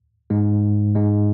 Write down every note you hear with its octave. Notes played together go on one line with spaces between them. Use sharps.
G#2 G#3
G#2 G#3